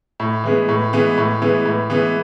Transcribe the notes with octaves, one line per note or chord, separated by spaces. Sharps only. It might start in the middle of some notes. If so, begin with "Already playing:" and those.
A2
E3 G#3 B3
A2
E3 G#3 B3
A2
E3 G#3 B3
A2
E3 G#3 B3